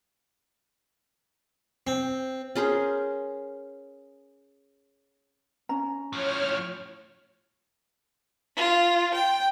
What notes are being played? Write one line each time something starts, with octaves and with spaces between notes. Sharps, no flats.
C4
C#4 G#4 A#4 C5
C#4 A#5
A2 F3 C#5 F6
F4
G5